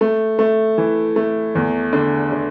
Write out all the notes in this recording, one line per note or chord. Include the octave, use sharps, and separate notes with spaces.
A3
A3
E3
A3
E2
D3
D3